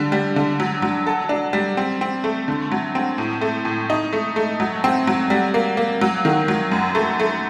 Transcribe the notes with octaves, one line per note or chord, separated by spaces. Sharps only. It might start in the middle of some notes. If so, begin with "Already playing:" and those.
Already playing: D3 G3
G3
D3
F#3
F#3
A4
D4
G3
C4
C4
A3
D3
F#3
C4
A2
A3
A2
D#4
A3
A3
F#3
C4
F#3
G3
A#3
A#3
F#3
D#3
F#3
F#2
A3
A3